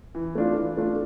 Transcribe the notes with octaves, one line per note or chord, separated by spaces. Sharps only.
E3
A3 D4 F4
E3
A3 D4 F4